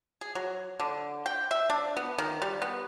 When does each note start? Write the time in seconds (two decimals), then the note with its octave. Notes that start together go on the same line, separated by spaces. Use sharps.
0.21 G#4
0.35 F#3
0.80 D3
1.26 G5
1.51 E5
1.70 D4
1.97 B3
2.18 D#3
2.42 G3
2.62 B3